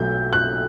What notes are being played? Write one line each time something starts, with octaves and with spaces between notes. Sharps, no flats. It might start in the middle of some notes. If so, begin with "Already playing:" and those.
Already playing: B1 B2 F#3 A3 G6
F#6